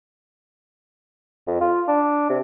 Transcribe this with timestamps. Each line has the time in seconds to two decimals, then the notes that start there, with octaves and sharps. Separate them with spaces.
1.47 F2
1.61 F4
1.88 D4
2.30 C3